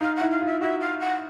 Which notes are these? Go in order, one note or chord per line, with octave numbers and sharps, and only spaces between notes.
D#4 F5
F#5
E4
F5
F4
E5
F#4 E5
F5
F#5